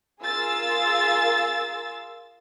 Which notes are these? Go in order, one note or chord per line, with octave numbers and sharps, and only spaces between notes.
F4 G#4 A#4 E6 A6